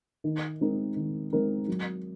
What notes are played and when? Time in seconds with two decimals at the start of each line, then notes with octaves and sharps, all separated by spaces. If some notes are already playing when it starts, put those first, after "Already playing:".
0.24 D#3
0.61 G#3 C4 D#4 A#4
0.96 D#3
1.32 G#3 C4 D#4 A#4
1.68 F#3